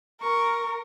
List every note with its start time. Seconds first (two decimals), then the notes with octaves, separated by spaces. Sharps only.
0.22 A#4 C#6